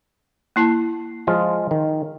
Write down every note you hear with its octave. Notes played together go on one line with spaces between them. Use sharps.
A#3 E4 A5
F3 G#3 F4
D#3